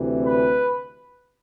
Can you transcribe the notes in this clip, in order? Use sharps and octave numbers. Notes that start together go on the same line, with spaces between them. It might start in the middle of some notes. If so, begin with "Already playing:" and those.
Already playing: D2 C3 E3
B4